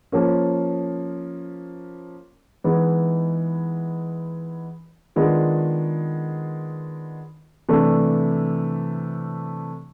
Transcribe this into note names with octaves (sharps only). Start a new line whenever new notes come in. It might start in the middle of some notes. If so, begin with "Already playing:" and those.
F3 A#3 C#4
E3 G#3 B3 D#4
D#3 G#3 B3 D4 F4
C3 E3 A3 D4